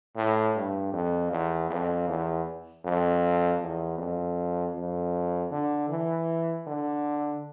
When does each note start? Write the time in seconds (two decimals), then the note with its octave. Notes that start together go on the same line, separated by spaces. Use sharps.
0.16 A2
0.56 G2
0.93 F2
1.31 E2
1.70 F2
2.08 E2
2.85 F2
3.61 E2
3.98 F2
4.75 F2
5.51 D3
5.89 E3
6.67 D3